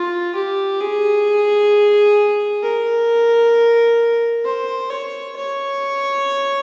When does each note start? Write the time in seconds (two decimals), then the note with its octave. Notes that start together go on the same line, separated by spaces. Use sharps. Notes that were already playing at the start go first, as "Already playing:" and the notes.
Already playing: F4
0.35 G4
0.81 G#4
2.63 A#4
4.45 C5
4.90 C#5
5.36 C#5